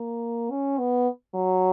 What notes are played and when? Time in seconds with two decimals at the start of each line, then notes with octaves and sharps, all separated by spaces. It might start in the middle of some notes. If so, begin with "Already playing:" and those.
Already playing: A#3
0.50 C#4
0.78 B3
1.34 F#3